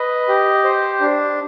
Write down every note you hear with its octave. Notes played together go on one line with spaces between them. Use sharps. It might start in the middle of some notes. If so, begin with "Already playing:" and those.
Already playing: B4 D#5
G4
C5
D4